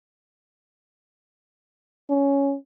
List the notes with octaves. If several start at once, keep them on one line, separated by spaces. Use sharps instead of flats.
C#4